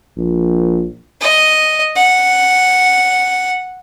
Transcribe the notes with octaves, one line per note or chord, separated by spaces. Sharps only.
A#1
D#5
F#5